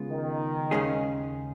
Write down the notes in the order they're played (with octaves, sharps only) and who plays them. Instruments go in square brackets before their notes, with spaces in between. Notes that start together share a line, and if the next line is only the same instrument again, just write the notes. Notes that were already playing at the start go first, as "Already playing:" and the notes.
Already playing: [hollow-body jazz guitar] C#3 G#3 B3 F4
[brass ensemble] D#3
[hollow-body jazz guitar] D#2 C#3 G#3 C#4 G#4